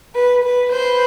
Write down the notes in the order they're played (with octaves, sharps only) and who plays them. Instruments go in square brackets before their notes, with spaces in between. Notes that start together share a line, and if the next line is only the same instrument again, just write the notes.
[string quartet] B4
B4
[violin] B4 [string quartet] C5